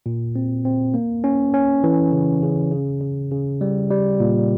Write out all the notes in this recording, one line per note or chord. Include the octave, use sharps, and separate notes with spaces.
A#2
C4
C4
A#3
C#4
C#4
E3
C#3
C#3
C#3
C#3
C#3
G3
G3
A#2